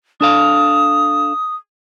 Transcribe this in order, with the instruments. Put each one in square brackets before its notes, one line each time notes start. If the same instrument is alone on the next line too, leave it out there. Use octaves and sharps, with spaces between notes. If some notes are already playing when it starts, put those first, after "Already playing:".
[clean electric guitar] D4 A4 F5 [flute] D#6